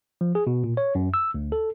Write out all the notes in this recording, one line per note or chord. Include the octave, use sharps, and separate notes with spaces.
F3
G#4
B2
A#2
C#5
F#2
E6
D2
A4